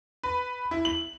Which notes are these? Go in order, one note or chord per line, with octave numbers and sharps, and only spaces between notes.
B4
E4
F#7